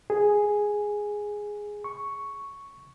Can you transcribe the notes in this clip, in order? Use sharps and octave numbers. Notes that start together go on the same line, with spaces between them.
G#4
C#6